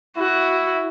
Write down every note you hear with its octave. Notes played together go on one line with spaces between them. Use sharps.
E4 F#4